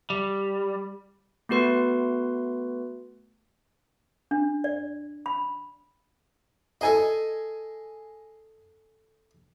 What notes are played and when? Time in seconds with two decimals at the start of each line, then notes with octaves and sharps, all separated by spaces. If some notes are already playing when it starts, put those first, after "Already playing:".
0.10 G3
1.49 A3 B3 F#4 B4 C6
4.31 D4
4.64 D5
5.26 B5
6.81 G#4 A4 D#5 G#5